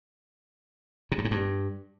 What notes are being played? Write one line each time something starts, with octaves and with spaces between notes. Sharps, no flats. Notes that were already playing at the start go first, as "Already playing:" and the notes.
C3
G2
G#2
G2